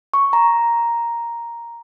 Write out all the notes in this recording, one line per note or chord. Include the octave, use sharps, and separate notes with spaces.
C#6
A#5